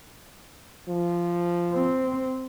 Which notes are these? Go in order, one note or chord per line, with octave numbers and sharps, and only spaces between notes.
F3
C4